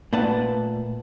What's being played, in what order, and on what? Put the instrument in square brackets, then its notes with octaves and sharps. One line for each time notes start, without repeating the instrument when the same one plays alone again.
[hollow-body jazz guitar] A#2 A3 B4 D5 F#5 A5